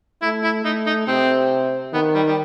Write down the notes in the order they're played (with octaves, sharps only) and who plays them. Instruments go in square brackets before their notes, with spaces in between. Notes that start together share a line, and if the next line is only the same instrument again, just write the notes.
[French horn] A3 [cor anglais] E4
[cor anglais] E4
[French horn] A3 [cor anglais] D#4
[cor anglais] D#4
[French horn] C3 [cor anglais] C4
[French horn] D#3 [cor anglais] B3
[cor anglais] G3
G3